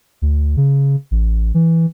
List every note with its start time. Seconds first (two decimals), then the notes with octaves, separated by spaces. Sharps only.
0.22 D2
0.57 C#3
1.11 A1
1.54 E3